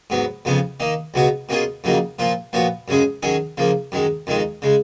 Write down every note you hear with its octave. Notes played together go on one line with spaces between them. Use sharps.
G#2 F#3 B3
F2 C#3 F3 B3
D#3 A#3 D#4
C#2 B2 F#3 B3 F#4
B2 A#3 C#4 F4 G#4
F2 C#3 F#3 A#3 D#4
A#2 F3 A#3 F4
A#2 F3 B3 F#4
F#2 C#3 G#3 C#4 G#4
D#3 F#3 C#4 G#4
C#3 F3 A#3
F#2 D#3 G#3
F2 D#3 G#3 D#4
C#3 G#3